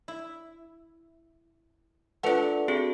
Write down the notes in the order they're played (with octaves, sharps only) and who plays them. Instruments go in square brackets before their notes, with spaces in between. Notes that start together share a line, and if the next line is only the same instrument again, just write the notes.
[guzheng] E4
[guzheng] A3 D4 [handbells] F4 B4 F#5
[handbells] C4 F#4 G#4 [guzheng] G5